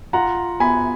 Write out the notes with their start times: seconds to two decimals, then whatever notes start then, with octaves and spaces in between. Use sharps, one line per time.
0.13 F4 F#5 A#5
0.60 B3 G#5 B5